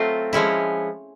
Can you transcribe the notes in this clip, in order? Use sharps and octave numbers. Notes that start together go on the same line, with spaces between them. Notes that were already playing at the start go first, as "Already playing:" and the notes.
Already playing: F#3 A3 C4 F4
F3 G#3 C#4 E4